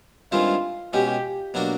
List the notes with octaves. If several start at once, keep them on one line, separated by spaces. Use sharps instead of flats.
G2 D#3 G#3 C4 E4 F4
B2 G#3 C#4 G4
B2 F#3 A#3 D4 F#4